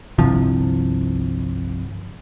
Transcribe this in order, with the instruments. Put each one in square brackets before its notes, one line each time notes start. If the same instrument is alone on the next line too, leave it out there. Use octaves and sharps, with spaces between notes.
[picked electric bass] G1 C2 C3 F3